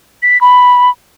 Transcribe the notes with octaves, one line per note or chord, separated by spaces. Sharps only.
B6
B5